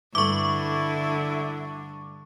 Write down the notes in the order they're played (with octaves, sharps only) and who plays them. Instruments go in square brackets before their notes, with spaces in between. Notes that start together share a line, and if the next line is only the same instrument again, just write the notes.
[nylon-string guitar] G2 A3 [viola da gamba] D3 [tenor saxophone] E4 [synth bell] C#6 D6